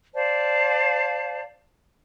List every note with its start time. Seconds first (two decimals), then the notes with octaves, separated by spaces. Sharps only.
0.14 C5 D5 F5 A5